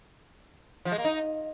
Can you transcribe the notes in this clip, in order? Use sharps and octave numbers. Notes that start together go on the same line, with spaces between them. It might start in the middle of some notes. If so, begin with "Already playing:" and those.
F3
G#3
A#3
D#4